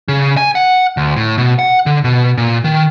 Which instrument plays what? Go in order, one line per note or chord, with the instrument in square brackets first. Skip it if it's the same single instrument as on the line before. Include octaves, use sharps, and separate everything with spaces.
[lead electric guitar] C#3
G#5
F#5
D2
A2
B2
F#5
D3
B2
A#2
D#3